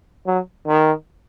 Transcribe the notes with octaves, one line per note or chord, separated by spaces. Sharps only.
F#3
D#3